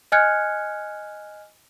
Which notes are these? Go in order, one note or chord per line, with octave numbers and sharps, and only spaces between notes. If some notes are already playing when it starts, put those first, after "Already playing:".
D#5 G#5 F6 F#6 G#6 C#7